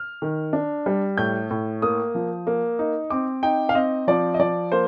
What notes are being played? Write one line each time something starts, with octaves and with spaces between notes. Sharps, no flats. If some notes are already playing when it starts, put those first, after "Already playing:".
Already playing: F6
D#3
D4
G3
A2 G6
A2
A#3 D#6
F3
A#3
D#4
C4 D6
D#4 G5
F5
C4 D#5
F3 D5
D#5
F3 D5
A#3 C5